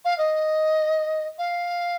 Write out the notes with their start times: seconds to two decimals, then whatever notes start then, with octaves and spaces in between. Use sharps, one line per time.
0.05 F5
0.18 D#5
1.39 F5